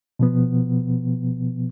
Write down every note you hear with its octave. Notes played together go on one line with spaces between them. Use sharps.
B2 F3 B3